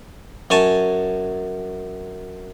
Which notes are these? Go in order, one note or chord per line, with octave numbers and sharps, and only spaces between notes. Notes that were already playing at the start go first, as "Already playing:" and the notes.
F#2 C#5 G#5 A5